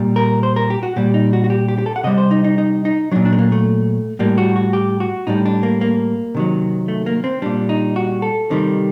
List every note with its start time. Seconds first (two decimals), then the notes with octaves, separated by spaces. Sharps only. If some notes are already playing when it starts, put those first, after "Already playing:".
Already playing: A#2 G3
0.16 A#4
0.43 C5
0.56 A#4
0.70 G4
0.83 F#4
0.96 A#2 G3 G4
1.14 D#4
1.33 F#4
1.44 F#4
1.50 G4
1.68 G4
1.78 G4
1.86 A4
1.96 F#5
2.04 C3 G3 D#5
2.18 C5
2.31 D#4
2.44 D#4
2.58 D#4
2.85 D#4
3.11 A#2 F#3 D4
3.25 D4
3.32 A3
3.39 A#3
3.52 A3
4.19 A2 G3 A#3
4.38 F#4
4.56 F#4
4.73 G4
5.00 F#4
5.27 A2 G3 D#4
5.46 D4
5.63 A#3
5.81 A#3
6.35 C3 D#3 F#3
6.88 A3
7.06 A#3
7.24 C4
7.42 A#2 G3 D4
7.69 D#4
7.96 F#4
8.22 A4
8.50 C3 D#3 G3